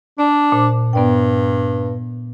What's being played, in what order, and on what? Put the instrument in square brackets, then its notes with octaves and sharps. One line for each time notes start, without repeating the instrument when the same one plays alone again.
[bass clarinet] D4 [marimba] D5
[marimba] A#2 C5
[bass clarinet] G2 [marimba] B3 D5 G5